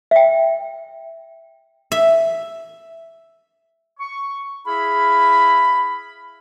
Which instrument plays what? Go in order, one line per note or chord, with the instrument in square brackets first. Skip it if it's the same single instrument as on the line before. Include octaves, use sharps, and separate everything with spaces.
[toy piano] E5 G5
[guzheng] E5
[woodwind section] C#6
E4 G#4 E5 F5 B5